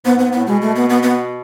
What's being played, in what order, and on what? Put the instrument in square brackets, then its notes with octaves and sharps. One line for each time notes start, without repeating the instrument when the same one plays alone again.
[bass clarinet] G#2 [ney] B3
[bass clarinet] G#2
[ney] B3
[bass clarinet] G#2
[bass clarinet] A2 [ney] B3
[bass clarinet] B2 [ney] G#3
[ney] A3
B3
B3
B3